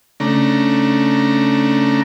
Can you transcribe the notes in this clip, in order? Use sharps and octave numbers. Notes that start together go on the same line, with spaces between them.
C#3 A3 D4 A#5